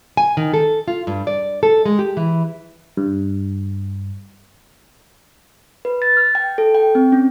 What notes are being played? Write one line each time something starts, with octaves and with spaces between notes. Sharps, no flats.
G#5
D#3
A4
F4
G2
D5
A4
G#3
G4
E3
G2
B4
A6
F6
G5
A4
G5
C4
C#4